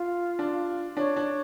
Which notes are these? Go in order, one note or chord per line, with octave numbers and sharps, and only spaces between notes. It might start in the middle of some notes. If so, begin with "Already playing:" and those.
Already playing: F4
D4
D4 C#5
D4